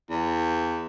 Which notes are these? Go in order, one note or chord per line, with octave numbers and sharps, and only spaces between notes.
E2